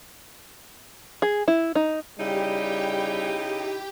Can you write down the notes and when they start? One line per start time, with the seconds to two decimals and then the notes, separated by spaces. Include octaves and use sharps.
1.22 G#4
1.48 E4
1.75 D#4
2.19 C#3 G3 D#4 E4 G4 G5